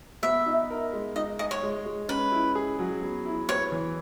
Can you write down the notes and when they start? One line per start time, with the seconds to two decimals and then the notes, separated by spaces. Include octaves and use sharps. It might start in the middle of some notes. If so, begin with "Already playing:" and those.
0.22 B3 E5
0.46 D#4
0.70 A#4
0.93 G#3
1.16 D#4 D#5
1.39 G#4 D#5
1.51 C#5
1.63 G#3
1.86 G#3
2.08 C#4 B4
2.32 E4
2.55 G#4
2.79 F#3
3.01 B3
3.25 E4
3.48 B4 C#5
3.71 E3